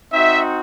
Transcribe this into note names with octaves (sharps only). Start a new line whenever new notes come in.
C4 D#4 F#4 E5